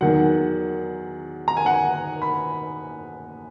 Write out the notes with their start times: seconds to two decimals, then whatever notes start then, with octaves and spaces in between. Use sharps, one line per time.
0.01 E2 D#3 F#3 F#5
1.48 A#5
1.57 G#5
1.66 F#5
1.74 G#5
2.22 B5